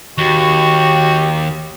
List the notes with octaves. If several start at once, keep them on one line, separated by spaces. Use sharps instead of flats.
D#2 F#4 G4